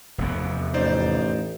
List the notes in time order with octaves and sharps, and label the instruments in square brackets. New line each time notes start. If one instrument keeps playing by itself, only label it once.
[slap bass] F1 E2 B3
[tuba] A1 [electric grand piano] D#4 C5 D5